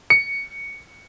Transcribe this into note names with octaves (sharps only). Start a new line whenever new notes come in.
C#7